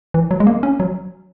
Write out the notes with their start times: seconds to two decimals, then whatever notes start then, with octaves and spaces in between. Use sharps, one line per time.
0.14 E3
0.31 F#3
0.40 G#3
0.47 A#3
0.63 C#4
0.80 F#3